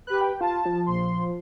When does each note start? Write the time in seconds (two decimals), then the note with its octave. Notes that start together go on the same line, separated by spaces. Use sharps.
0.07 G4 B4 F#6
0.21 G5
0.41 F4 A5
0.65 F3
0.86 A#1 C6